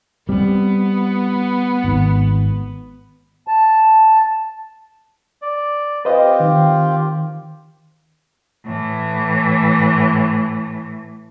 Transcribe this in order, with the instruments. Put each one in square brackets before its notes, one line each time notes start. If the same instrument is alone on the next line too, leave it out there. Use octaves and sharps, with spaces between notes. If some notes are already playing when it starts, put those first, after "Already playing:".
[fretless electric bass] G3 C4 [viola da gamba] B3
[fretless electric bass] G#1
[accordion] A5
[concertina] D5
[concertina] C4 F4 G4 [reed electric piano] B4 C5 D#5
[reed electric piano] D#3
[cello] A2 E3